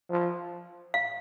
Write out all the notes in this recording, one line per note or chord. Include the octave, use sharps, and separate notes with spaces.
F3
F5